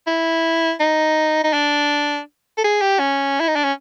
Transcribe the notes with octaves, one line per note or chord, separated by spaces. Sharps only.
E4
D#4
D#4
D4
A4
G#4
G4
C#4
E4
D#4
D4
C#4